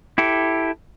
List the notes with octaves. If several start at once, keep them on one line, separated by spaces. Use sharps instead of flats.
E4 G4 A4